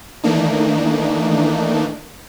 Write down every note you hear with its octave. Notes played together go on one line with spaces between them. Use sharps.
D#3 E3 A3 A#3 D4 D#4